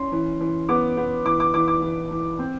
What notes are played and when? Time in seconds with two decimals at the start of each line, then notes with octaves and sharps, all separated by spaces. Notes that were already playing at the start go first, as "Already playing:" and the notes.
Already playing: C#4 C6
0.12 E3
0.41 E3
0.69 B3 D6
0.97 B3
1.25 E3 D6
1.40 D6
1.54 E3 D6
1.68 D6
1.82 E3
2.11 E3
2.39 C4